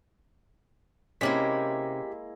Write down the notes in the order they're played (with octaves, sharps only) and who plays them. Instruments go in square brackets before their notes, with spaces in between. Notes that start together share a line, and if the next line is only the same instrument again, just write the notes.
[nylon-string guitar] C3 C#4 [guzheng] G#3 A#3 E4 [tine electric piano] G4 B6